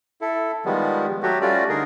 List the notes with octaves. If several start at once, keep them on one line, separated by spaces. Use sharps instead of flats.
E4 A4
D#3 F3 G3 G#3 B3
F#3 A3 F#4 G4
G3 A3 C#4 F4 F#4 D5
D3 D#4 G#4 A#4